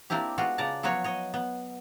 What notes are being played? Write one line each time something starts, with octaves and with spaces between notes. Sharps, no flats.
A#3 C4 D4 E4 G4
G#3 B3 F4 F#4
C#3 D5 A5 A#5
F3 F#3 B3 F#4 C#5
C#5 D#5
B3